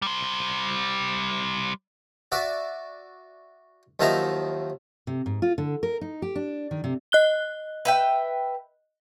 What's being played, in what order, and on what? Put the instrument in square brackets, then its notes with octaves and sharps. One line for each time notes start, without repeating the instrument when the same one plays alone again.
[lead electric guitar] G3 C5
[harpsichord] F#4 D5 E5
D#2 F3 F#3 D#4 E5 A#5
[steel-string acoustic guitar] C3
G#2
F4
D3
A#4
D#4
G4
D4
D#3
C3
[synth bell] D#5 F#6 G7
[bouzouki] B4 E5 G5